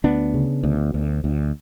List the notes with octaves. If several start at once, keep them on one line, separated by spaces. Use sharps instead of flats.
D2 B3 D4
C#3
D2
D2
D2